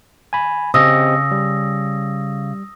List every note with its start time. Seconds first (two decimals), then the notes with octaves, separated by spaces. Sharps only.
0.33 G#5 B5
0.74 C#3 C4 G4 D#5 D#6 E6 A#6
1.31 G3